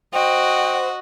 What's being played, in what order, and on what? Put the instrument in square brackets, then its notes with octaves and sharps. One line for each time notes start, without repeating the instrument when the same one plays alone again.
[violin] F#4 [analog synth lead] C5 [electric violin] D#5 F#5 [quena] G5